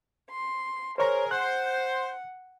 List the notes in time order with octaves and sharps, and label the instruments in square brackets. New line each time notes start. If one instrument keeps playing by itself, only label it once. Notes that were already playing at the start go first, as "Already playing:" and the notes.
[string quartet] C6
[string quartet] G#4 [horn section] A#4 [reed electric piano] C5 C#5 A#5
[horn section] C5 [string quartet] F#5 [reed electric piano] F#6